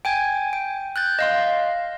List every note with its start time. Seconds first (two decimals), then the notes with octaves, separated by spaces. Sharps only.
0.05 G5 G#5 G#6
0.53 G5
0.96 F#6 G6 A6
1.19 D#5 F5 C6